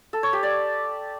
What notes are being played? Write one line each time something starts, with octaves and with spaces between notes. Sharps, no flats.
A4
C#5
G4
D5